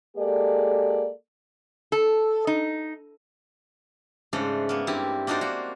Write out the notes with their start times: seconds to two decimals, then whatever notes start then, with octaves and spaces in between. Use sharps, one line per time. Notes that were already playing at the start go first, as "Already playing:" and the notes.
0.17 G#3 A#3 G4 A4 D5
1.92 A4
2.47 D#4
4.33 G#2 C#3 A3 D4 C5
4.69 A#3 B3
4.87 G2 C4 E4 G4
5.27 A#3 D4 D#4 F#4 C5 D5
5.41 A#3 F#4